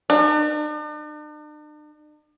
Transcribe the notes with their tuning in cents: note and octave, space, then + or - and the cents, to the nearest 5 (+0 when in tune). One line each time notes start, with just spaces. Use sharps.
D4 +45